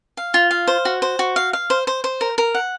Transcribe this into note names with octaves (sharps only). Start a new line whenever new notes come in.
F5
F4
F5
C5
F#4
C5
F#4
F5
F5
C5
C5
C5
A#4
A#4
F#5